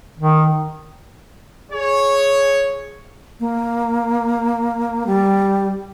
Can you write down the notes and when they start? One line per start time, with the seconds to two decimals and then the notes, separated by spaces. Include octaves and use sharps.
0.18 D#3
1.71 G#4 C#5
3.40 A#3
5.07 G3